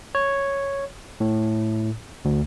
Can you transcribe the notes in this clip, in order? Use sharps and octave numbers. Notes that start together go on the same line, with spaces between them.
C#5
A2
D2